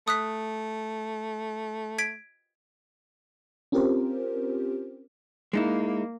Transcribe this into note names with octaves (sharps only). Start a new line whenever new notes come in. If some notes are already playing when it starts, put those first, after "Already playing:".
A3 D#6 F#6 B6
G#6 B6 D7
C4 C#4 F4 G4 A#4 C5
G#3 A#3 D#4 E4